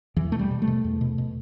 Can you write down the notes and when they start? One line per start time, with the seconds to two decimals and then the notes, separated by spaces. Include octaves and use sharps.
0.16 E2 E3
0.32 B2 A3
0.39 G3
0.51 B2
0.62 A3
0.67 B2
0.84 E2
1.01 B2
1.18 B2